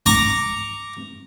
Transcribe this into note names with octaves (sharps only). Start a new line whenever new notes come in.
A#5 C#6 D6